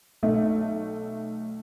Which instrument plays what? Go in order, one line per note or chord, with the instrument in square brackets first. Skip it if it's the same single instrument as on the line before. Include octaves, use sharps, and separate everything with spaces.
[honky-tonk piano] B1 A3